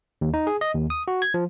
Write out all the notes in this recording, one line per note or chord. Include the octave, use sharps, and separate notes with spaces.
D#2
D#4
G#4
D#5
D#2
D#6
F#4
G#6
F3